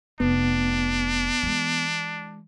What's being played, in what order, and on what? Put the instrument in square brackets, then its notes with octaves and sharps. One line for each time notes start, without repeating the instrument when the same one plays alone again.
[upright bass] F1 [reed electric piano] B3 [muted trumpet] D4
[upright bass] E3 G#3